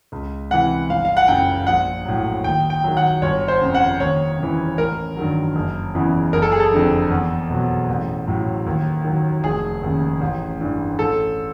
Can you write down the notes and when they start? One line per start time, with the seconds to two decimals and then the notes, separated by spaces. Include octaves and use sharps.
0.12 C#2
0.50 C3 E3 F#5
0.89 G1 F5
1.05 F5
1.17 F#5
1.28 F#2 C#3 G5
1.67 A#1 F#5
2.05 A2 F#3
2.44 D#2 G5
2.70 G5
2.84 D#3 F#3
2.97 F#5
3.22 G1 C#5
3.48 C5
3.61 F2 C#3
3.74 F#5
4.00 D#2 C#5
4.39 C#3 E3
4.78 A1 A#4
5.17 G2 D#3 F#3
5.55 F#1
5.95 E2 C#3 E3
6.33 F#1 A#4
6.42 A4
6.52 G#4
6.60 A4
6.72 F2 D3 F3
7.10 E2
7.50 B2 F#3
7.89 A1
8.28 A2 F#3
8.66 D#2
9.04 D#3 F#3
9.43 F1 G#4
9.83 D#2 C#3
10.21 A1
10.61 G2 E3
10.99 A1 A4